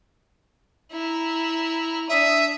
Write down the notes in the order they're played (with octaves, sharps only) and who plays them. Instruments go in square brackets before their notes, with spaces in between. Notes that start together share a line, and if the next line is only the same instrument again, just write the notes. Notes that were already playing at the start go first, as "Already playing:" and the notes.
[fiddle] E4 A#5
[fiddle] D4 D#6 [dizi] E5